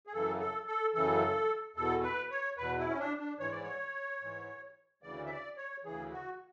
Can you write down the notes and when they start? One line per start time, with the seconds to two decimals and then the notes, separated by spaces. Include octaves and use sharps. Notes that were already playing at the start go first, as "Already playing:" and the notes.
0.07 G#4
0.13 F#2 C#3 E3 A4
0.40 A4
0.67 A4
0.95 F#2 C#3 E3 A4
1.76 E2 B2 A4
2.03 B4
2.31 C#5
2.58 E2 B2 B4
2.78 E4
2.89 C#4
2.99 D4
3.19 D4
3.40 G#2 E3 C#5
3.51 D5
3.63 C#5
4.21 G#2 E3
5.03 D2 C#3 E3 D5
5.26 E5
5.30 D5
5.57 C#5
5.84 D2 C#3 E3 G#4
6.11 F#4